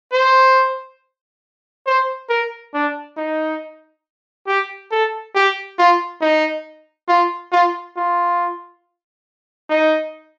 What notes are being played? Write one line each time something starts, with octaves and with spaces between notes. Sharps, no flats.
C5
C5
A#4
D4
D#4
G4
A4
G4
F4
D#4
F4
F4
F4
D#4